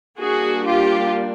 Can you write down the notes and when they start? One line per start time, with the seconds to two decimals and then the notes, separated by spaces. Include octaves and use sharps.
0.19 G3 A#3 D4 F#4 G#4
0.66 F4 G4